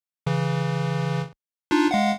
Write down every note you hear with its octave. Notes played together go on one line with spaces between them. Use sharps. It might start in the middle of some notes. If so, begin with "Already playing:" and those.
C#3 E3
D4 D#4 F4
G#3 F5 F#5